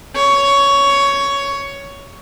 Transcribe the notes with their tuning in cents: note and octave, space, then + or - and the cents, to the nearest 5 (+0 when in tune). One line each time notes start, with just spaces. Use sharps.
C#5 +10